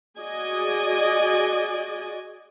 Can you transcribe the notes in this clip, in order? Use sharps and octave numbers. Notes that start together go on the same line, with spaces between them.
F#4 G#4 D5 D#5 G#5